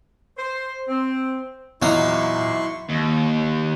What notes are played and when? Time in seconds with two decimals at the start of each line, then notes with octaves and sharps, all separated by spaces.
0.37 C5
0.88 C4
1.82 E2 A#2 F#3 D#4 E4 F5 C6 C#6
2.89 D#2